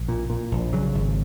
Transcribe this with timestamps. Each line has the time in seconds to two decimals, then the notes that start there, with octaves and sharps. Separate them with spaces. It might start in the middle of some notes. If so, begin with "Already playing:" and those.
Already playing: A#1
0.08 A#2
0.30 A#2
0.52 A#1
0.73 C#3 F#3
0.95 G#1